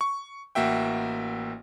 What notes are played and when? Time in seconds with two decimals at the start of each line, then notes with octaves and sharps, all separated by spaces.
0.01 C#6
0.55 A1 A#3 F#4 E5 G5